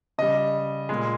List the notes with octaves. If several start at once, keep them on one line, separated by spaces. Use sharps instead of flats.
C#3 G3 D#5
A#2 G#3